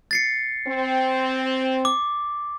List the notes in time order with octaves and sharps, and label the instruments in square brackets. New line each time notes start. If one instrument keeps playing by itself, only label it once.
[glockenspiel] A6 C7 C#7
[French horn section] C4
[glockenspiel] D6